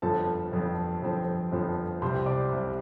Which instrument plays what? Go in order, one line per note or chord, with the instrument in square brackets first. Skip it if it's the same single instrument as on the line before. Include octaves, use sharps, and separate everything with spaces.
[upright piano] G1 F2 F3 C4 A4 A5
G1 F2 F3 C4
G1 F2 F3 C4
G1 F2 F3 C4
C2 C3 G3 C5 C6
D5 D6
C2 C3 G3